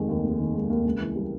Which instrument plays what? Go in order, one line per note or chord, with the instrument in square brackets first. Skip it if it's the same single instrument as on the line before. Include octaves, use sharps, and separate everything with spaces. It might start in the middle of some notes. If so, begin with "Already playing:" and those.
Already playing: [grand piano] F1 D#3 G#3
D#2
F1
D#3
G#3
D#2
C#2
E3
G3